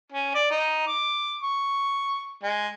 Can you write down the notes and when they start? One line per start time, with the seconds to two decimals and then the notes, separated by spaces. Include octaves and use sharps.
0.12 C#4
0.35 D5
0.51 D#4
0.87 D6
1.43 C#6
2.43 G#3